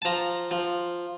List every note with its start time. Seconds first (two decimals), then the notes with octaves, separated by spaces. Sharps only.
0.02 A5
0.05 F3 A#5
0.51 F3